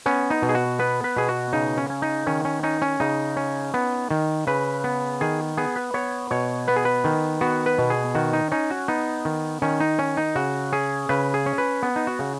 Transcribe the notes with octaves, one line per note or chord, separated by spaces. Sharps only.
B3 C#4
D#4
B2
G#4
F#4
B3 B4
B4
B2 G#4
F#4
C#3 D#4
C#4
C#4
D#4
D#3 C#4
C#4
C#4 D#4
C#4
C#3 D#4
C#4
B3
D#3
C#3 B4
B3
D#3 G#4
B3 G#4
B4
B3 C#5
B2 C#5
B3 B4
G#4
B4
D#3
B3 F#4
B4
B2
G#4
D#3 F#4
D#4
C#4 D#4
F#4
B3 D#4
D#3
D#3 C#4
D#4
C#4
D#4
C#3 F#4
C#4 G#4
C#3 B4
G#4
C#4
B4
B3
D#4
F#4
C#3